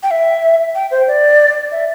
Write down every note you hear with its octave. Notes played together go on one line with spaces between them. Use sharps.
G5
E5
G5
C5
D5
E5